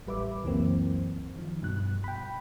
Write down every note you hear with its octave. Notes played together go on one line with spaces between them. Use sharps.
A1 G3 B4 E5 D6
C#2 F#2 E3 A#3 C4
D#3 F3
G2 B2 F#6
G5 B5